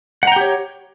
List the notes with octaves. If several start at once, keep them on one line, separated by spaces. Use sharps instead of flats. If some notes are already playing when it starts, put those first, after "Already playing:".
G4 C#5 F#5 G5 A#5